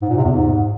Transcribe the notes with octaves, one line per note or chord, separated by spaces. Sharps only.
G#2
A#2
C3
E2
G#2